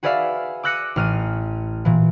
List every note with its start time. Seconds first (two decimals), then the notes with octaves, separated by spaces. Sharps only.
0.03 F#4 G#4 B4 D5 E5 F5
0.63 D6 E6 F#6 A#6 C#7 D#7
0.96 A1 F6 D#7
1.85 A#2 E3